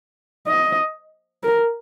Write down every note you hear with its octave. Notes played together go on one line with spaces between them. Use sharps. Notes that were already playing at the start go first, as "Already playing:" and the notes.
D#5
A#4